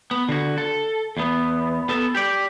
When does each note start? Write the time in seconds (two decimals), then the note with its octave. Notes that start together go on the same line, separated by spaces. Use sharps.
0.11 B3
0.29 D3 F#4
0.58 A4
1.17 E2 B3
1.89 B3 A4
2.15 G4 D5